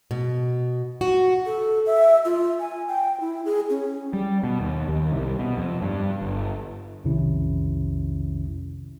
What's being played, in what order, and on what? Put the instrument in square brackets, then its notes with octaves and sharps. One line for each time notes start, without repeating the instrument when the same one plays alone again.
[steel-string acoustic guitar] B2
F#4
[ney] A4
E5
F4
G#5
G5
E4
G#4
C#4
[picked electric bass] G3
B2
D#2
D#2
C2
B2
F2
G2
G1
[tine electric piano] B1 F2 C3 D#3 C#4 E4